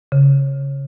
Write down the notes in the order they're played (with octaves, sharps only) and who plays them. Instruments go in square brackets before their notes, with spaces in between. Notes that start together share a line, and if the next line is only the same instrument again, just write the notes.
[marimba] C#3